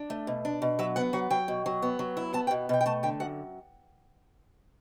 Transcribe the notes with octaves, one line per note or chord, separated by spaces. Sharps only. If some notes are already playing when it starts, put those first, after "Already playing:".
Already playing: D4
A3
B2
D4
B2
F#3 E5
B3 F#5
F#3 F#5
F#3 G5
B2
F#3
B3
F#3
E4
B3 A5
G5
B2
B2 G5
G5
A3 A5
D3 G5
F#2 F#5